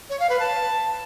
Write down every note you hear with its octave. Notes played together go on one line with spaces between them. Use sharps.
C#5
F5
B4
A5